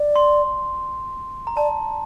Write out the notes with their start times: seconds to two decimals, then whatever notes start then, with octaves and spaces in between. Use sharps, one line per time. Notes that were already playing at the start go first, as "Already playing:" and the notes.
Already playing: D5
0.16 C6
1.47 A#5
1.57 D5 A5